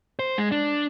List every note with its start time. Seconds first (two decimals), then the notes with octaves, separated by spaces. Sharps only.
0.19 C5
0.38 G#3
0.52 D4